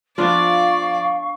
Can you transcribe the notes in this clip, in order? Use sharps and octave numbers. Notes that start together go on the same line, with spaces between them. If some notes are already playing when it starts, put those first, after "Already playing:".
F3 B3 D4 F4 D5 F5 C#6